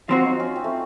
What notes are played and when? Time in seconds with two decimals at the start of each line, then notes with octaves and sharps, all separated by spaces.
0.08 F3 C4 F4 F#4
0.25 D#4
0.40 C#4
0.56 C4
0.64 A3